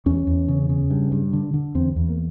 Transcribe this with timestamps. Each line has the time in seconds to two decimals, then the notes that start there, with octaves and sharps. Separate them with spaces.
0.06 E2 C#4
0.27 E2
0.48 C#3
0.69 C#3
0.90 G2
1.12 G2
1.33 D3
1.54 D3
1.75 E2 C4
1.96 E2
2.09 A#3